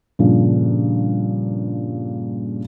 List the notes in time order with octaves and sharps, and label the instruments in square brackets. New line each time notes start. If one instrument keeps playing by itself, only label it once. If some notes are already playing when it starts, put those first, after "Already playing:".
[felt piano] G2 A#2 C#3 F3